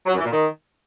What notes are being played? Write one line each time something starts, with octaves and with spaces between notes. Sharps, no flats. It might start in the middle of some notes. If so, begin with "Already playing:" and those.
F#3
F#2
E3
A#2
D#3